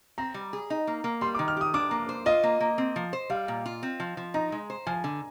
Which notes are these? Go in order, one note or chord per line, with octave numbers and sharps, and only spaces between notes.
C4 A#5
G3
G#4
D#4
A#3
A#3
G3 C6
D6
D#3
F6
G4 D#6
D4 D6
A#3
C5
F4 D#5
A#3
A#3
C4
F3
C5
G3 F5
A#2
F4
C4
F3
F3
D#4 A#5
G#3
C5
F3 G#5
D3